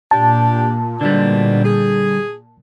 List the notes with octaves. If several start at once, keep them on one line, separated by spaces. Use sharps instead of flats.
A#2 D4 G4 A5
G#2 B2 D3 G3 D4
G#4